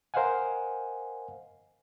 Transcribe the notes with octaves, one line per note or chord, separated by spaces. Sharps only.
A#4 C5 D#5 F5 F#5 G#5